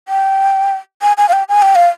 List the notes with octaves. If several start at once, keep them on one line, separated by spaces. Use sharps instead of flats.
G5
G#5
G#5
F5
G5
G#5
G5
F5